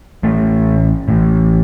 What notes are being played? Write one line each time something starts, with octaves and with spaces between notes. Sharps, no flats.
A1 A2 A3
A1 A2